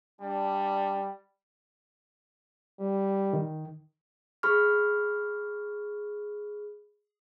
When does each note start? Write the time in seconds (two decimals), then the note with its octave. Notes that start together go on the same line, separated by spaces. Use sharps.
0.21 G3 D4
2.80 G3
3.33 D#3
4.43 G#4 B5 C#6 F6